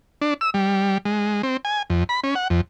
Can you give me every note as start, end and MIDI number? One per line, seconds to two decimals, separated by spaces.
0.22 0.34 62
0.41 0.50 88
0.54 0.98 55
1.05 1.42 56
1.43 1.57 60
1.65 1.82 80
1.90 2.04 41
2.09 2.20 83
2.24 2.35 61
2.35 2.48 78
2.50 2.61 41